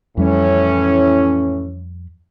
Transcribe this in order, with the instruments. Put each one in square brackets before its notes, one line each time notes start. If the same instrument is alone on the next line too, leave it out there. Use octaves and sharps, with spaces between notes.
[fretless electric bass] F2 G3 [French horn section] A2 E3 C#4